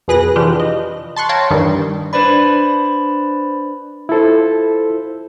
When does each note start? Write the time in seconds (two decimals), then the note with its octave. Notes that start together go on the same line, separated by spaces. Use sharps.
0.08 F2 B2 G#4 B4 F#6 A#6
0.36 C3 E3 D4 F4 G4
0.60 D#5
1.16 A5 C6 C#6 F#6
1.29 C#5 F5 G5 A5 A#5 C6
1.50 G2 D#3 E3 G3
2.13 D4 B4 C5 D5 B5
4.09 E4 F4 A4 C5